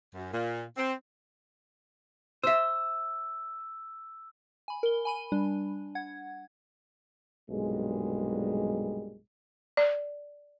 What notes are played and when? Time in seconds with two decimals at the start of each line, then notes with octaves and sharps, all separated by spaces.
0.14 F#2
0.33 A#2
0.77 C4
2.44 C5 E5 E6
4.68 G#5 B5
4.83 A#4 G7
5.05 G#5 B5 D#7
5.32 G3 D4
5.95 F#5 G#6
7.50 B1 G2 A#2 G3 G#3
9.77 D5